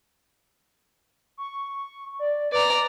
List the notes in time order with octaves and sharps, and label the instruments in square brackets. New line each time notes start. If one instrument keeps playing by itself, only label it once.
[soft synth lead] C#6
D5
[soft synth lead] B4 [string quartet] D5 A#5